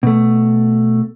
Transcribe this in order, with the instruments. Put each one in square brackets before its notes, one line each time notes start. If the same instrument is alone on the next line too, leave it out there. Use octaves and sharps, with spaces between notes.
[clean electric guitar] B2 A3